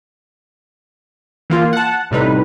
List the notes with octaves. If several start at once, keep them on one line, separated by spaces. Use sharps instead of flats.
E3 A#3 F4
F#5 A5
A1 A2 C3 G3 D#4 B4